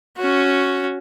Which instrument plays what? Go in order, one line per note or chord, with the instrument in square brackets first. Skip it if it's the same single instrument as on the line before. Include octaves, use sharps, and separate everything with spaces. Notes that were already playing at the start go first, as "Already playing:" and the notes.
[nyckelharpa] C#4 F#4